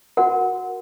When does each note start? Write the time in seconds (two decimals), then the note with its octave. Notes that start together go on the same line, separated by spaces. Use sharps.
0.17 F#4 A#4 F#5